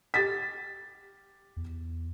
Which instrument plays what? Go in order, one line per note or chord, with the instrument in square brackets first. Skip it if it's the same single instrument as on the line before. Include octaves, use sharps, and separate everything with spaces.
[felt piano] G4 A6 B6
[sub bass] E2